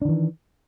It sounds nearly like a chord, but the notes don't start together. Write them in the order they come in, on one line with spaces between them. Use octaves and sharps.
D4 D#3 E3